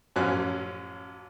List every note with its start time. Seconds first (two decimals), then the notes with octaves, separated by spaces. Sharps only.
0.16 A1 F#2 F3 C#4 F#6